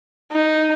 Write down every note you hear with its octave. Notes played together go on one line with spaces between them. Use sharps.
D#4